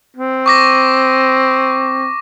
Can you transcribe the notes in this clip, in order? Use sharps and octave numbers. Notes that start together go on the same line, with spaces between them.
C4
C#6 D6 A#6